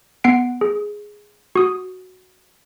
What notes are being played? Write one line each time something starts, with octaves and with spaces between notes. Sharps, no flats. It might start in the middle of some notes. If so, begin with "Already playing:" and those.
B3 F#5 C7 D7
G#4
F#4 D#6